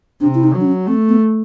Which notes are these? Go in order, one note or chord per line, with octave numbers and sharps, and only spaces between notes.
C3 D4
E4
D#4
F#3
D4
C#4
A3 C4
B3